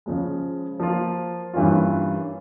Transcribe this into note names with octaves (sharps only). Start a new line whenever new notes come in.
C#3 F3 G#3
F3 A#3 F4
G2 E3 A#3 C#4 F4